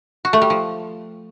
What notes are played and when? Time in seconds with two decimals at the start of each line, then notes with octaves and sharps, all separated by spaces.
0.25 F#4
0.33 A3
0.42 G3
0.50 F3